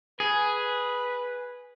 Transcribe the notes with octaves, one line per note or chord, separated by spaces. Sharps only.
G#4 B4